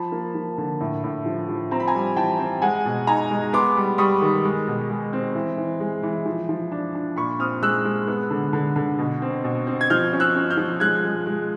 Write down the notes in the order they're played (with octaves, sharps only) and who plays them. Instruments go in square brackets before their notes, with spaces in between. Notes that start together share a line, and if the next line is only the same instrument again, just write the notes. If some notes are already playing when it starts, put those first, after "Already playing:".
Already playing: [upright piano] F3 A5 B5
A#3
F3
D3
A2
A2
F3
F3
C4 A#5
B5
G#5 A#5
G3
E3 G5 A5
C4
G#3 F#5 G#5
B2
D#4 G#5 A#5
G#3
B3 C6 D6
G3
G3 C#6 D#6
D#3
G#3
B2
G#3
C4
E3
E3
G#3
E3
F3
F3
D4
D4
A#2 B5 C#6
C4 D#6 F6
G#3 E6 F#6
G#3
B3
D3
D3
D3
B2
C4
B2
C4
G#6
F3 F6 G6
C#4
E6 F#6
C#4
F6 G6
F3
G#3 F#6 G#6
G#3
G#3